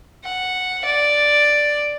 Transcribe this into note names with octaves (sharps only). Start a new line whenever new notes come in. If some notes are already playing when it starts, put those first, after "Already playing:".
F#5
D5